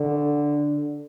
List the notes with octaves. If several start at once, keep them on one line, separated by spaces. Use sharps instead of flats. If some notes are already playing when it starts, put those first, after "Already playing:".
Already playing: D3